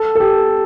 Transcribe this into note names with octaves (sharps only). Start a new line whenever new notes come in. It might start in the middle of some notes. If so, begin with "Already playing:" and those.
Already playing: A4
A4
G4